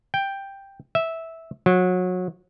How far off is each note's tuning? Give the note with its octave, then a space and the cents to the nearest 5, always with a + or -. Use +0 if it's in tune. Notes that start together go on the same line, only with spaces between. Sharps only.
G5 +5
E5 -10
F#3 -25